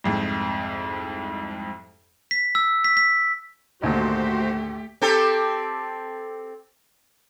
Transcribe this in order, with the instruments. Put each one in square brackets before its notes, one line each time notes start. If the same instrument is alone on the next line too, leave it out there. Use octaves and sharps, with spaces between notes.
[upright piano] C2 F2 G#2
[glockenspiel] B6
E6
B6
B6
[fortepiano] G#1 D2 A#2 [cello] A3 G4 [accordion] F#4 C5
[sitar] C4 G4 A4